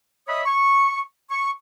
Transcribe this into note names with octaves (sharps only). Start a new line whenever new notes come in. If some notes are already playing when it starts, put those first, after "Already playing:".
C#5 D#5 E5 B5 D#6
C#6
C#6